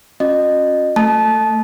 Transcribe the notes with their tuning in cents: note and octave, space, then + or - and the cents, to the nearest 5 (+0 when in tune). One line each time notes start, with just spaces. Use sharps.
C#4 -25 F#4 -40 D#5 -25
A3 +15 A5 -20